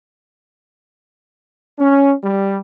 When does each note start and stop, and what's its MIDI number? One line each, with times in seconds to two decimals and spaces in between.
1.79 2.13 61
2.24 2.59 55